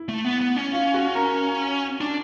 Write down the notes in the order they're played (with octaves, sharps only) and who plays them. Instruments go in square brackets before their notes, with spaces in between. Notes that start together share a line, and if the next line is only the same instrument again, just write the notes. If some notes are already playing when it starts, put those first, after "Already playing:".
Already playing: [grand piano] E4
[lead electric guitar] A3
B3
B3
C#4
[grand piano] F4 F5
F#4 F#5
A#4 A#5
[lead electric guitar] D4